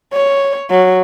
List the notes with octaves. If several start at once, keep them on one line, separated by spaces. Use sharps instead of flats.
C#5
F#3